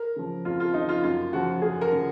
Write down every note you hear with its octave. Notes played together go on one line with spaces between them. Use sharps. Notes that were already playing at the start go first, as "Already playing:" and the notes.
Already playing: A#4
C#3 F3
F2 F4
F4
C#3 F3 D#4
F4
F#2 F4
C#3 F3 F#4
F#2 G#4
A#4
C#3 F3